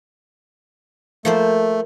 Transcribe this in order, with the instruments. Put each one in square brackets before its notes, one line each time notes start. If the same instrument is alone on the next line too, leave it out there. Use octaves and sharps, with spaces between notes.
[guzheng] F3 A#3 C5 [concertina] A3